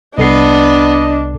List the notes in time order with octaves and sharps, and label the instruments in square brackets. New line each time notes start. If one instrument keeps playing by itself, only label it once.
[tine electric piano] C2 A4 C7 [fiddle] B3 [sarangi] D4 [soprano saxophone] D#5